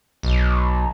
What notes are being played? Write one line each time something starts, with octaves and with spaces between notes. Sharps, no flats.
B1